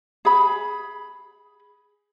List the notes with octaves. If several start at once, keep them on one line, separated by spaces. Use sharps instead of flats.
G#4 B5